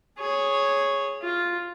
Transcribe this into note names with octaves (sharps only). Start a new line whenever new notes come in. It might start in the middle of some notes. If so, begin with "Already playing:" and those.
G#4 C#5
F4